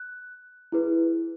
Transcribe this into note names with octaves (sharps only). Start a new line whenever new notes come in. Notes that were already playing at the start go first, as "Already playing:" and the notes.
Already playing: F#6
E4 G#4 B4